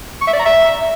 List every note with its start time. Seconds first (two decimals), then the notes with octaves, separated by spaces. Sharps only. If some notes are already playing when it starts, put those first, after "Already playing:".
0.21 C#6
0.27 E5
0.33 D5
0.39 A#5
0.46 E5